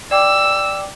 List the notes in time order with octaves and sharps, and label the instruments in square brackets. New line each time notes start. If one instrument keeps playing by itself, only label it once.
[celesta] D5 G5 D6 [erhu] E6